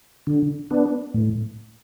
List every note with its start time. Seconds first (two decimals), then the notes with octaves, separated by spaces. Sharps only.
0.27 D3
0.71 B3 D4
1.14 A2